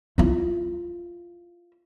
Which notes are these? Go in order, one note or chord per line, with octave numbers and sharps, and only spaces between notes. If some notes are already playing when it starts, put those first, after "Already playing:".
E4 F4